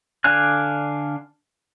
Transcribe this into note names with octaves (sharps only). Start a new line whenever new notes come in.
D3 D4 F5 G#5 F#6